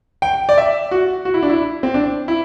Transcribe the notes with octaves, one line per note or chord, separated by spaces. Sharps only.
G5
D5
E5
F#4
F#4
E4
D4
E4
C4
D4
E4